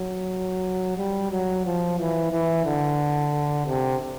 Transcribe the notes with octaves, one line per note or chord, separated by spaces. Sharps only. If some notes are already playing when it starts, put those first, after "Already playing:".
Already playing: F#3
G3
F#3
F3
E3
E3
D3
C3